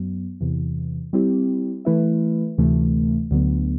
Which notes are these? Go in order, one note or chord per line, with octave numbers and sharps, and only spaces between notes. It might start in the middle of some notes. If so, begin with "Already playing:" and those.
Already playing: F#2 F#3 B3
E2 C3 E3
G3 C4 E4 G4
E3 A3 E4 B4 E5
D2 C3 E3 A3
D2 D3 F#3 B3